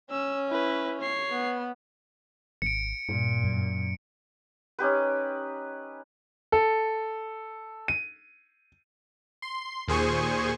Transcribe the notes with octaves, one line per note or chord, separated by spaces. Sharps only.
C#4 E6
E4 B4
C#5 C7
B3
G#1 C#7 D7
G2 A#2
F#2
C#4 D#4 G4 B4
A4
D#7
C6
D#2 A#2 G#4 C5 G#5 C#6